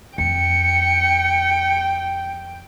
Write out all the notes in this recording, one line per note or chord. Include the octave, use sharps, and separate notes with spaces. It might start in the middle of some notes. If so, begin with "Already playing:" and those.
F2 G5 C#7